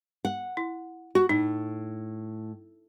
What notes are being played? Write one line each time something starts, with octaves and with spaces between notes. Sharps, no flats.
F#5
E4
F#4
A2 D#4